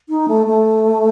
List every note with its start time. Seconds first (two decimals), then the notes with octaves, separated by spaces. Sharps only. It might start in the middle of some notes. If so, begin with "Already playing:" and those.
0.09 D#4
0.28 A3
0.47 A3